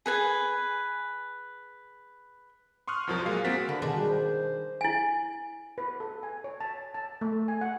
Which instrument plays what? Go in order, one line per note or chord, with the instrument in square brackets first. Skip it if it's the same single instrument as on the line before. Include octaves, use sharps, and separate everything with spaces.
[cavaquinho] G#4 B4 G#5
[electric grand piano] C6 C#6 D#6 F6 F#6
C2 F2 F3 F#3 A#4 C5
A#2 G#3 F5
G#3 A#3 C4 F#4 A6 B6
[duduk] D3 [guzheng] B4
[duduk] B2 [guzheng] D#3 G#3 D4
[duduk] G3
C5
[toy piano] E4 G#5
[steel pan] B4
A4
G#5
C#5
A5
A5
A3
G#5
F#5